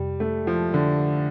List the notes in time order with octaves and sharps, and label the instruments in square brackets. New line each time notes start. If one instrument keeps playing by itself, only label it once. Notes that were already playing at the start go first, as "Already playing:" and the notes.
Already playing: [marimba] F2 C3 [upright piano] G3
[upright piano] A3
F3
D3